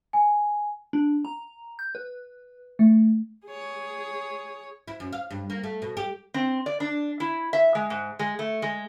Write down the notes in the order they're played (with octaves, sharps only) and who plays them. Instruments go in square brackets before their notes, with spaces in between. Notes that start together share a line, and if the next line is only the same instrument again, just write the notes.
[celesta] G#5
[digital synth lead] D4
A#5
G6
B4
A3
[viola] G#4 C#5
[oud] E4
F#2
F5
G2
A#3
A3
B2
G4
[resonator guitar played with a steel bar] C4
D5
D4
E4
E5
G#3
G#2
G#3
A3
G#3